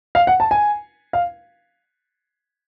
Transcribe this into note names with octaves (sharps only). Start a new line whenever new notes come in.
F5
F#5
A5
G#5
F5